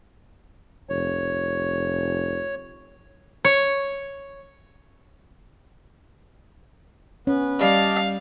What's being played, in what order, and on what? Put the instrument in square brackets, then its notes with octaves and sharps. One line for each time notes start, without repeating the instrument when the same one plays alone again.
[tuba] F1 [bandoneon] C#5
[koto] C#5
[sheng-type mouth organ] B3 B4 [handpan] C#4
[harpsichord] G3 [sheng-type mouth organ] D5 D#5 A5 [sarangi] F5